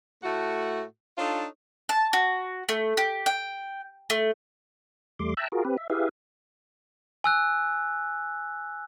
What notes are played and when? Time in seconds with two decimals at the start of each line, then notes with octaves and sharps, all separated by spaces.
0.23 A2 A3 F#4
1.18 D4 D#4 F4 A4 C#5
1.89 A5
2.13 F#4
2.69 A3
2.97 G4
3.26 G5
4.10 A3
5.19 E2 G3 A3 C6 D6
5.37 E5 G5 A5 A#5 E6 F#6
5.52 F4 F#4 G#4 A#4
5.65 C4 G4 B4
5.78 E5
5.90 E4 G4 G#4 B4 E5 F5
7.24 G#5 E6 F#6